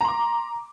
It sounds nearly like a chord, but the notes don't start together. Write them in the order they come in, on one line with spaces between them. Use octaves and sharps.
A#5 C6 D6